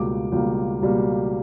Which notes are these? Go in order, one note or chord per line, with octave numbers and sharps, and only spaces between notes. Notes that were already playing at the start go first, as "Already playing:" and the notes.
Already playing: C#2 B2 G3 A#3 D6
C#2 B2 G3 A#3
C#2 B2 G3 A#3